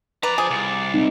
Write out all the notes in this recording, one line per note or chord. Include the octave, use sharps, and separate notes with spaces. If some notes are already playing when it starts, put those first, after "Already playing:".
F2 B4 D5 A#5
F4 G#4 C5
C2 D5
G#3 C4 D#4